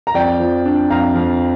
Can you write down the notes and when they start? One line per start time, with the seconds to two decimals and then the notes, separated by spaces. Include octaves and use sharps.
0.07 A#5
0.15 F2 D5 G5
0.40 F3
0.66 D4
0.90 F2 F5 A#5
1.15 F2